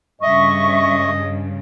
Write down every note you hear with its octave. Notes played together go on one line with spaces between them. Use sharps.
G2 C#3 D#5 E5 C#6